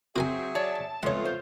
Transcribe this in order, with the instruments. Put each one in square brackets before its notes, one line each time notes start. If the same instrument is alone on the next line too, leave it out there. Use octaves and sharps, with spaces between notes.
[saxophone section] F#3 G#4 E5 [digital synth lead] C4 [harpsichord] F#4 A#4 G#5
[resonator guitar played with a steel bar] C#5 D5 [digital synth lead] A5
[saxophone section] F2 A3 B3 [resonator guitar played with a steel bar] G#3 [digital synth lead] F4 [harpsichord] C#5 F#5
[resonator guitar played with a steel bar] C5